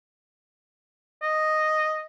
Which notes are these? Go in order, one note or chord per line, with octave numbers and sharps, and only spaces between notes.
D#5